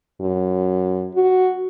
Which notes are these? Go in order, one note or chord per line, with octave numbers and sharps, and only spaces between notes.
F#2
F#4